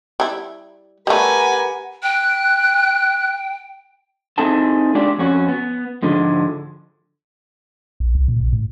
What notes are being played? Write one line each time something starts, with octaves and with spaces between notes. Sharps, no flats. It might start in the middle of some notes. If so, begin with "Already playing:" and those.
G3 E4
G3 A3 G4 A#4 B4 F#5 G#5
G5 F#6
C4 D#4 E4 G#4 A4 A5
G#3 D4 F4 G4 D5
F2 C#4 F#4
B3
G#2 D3 F3 G#3
A#1
C2
A#2
A#1
A2